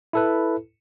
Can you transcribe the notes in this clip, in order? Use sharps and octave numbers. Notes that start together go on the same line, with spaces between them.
E4 A4 B4